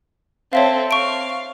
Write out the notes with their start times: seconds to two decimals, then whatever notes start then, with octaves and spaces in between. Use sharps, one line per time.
0.53 C4 A4 C#5 E5 F5
0.91 F5 C#6 D7